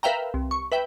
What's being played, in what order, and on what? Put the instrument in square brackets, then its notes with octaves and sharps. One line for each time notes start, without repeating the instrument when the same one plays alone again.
[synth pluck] A#4 B4 E5 F5 G5 A#5
C2
C#6
B4 E5 G5